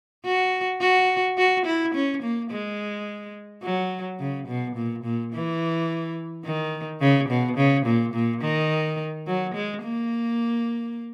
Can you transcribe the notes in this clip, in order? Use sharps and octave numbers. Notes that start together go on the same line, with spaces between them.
F#4
F#4
F#4
E4
C#4
A#3
G#3
F#3
C#3
B2
A#2
A#2
E3
D#3
C#3
B2
C#3
A#2
A#2
D#3
F#3
G#3
A#3